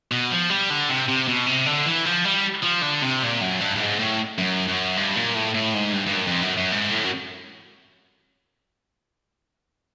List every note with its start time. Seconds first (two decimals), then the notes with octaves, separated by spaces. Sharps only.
0.12 B2
0.31 F3
0.50 G3
0.70 D3
0.89 C3
1.08 C3
1.28 B2
1.46 C3
1.66 D3
1.86 E3
2.05 F3
2.25 G3
2.63 F3
2.82 D3
3.02 C3
3.22 A#2
3.41 F#2
3.60 G2
3.76 G2
3.80 G#2
3.99 A2
4.38 F#2
4.68 F#2
4.97 G2
5.16 A#2
5.35 A2
5.54 A2
5.74 G#2
5.93 G2
6.07 G2
6.13 F#2
6.27 F2
6.42 F#2
6.57 F#2
6.72 G#2
6.90 A2
7.04 F#2